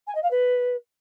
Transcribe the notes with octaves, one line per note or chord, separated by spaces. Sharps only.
G#5
D#5
F5
B4